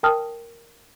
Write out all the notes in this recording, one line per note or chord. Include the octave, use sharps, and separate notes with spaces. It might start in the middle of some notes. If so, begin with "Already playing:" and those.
A#4 G5 A5 D#6 F6